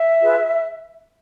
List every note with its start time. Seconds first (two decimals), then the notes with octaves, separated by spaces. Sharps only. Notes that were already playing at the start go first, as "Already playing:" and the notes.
Already playing: E5
0.20 F4 G#4 B4